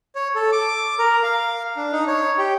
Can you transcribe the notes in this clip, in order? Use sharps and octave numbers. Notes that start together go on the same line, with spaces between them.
C#5
A4
D6
A#4
F5
D4
D#4
C#5
G4